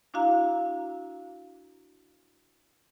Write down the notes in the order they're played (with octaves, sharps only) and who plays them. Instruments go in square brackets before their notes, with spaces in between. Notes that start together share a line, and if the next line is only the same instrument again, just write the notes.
[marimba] D4 E4 F#4 F5 A#5